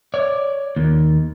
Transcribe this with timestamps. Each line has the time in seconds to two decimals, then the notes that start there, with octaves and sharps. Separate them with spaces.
0.14 C#5 D5
0.76 D#2